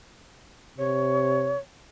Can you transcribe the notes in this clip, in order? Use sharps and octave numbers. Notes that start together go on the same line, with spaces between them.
C3 C#5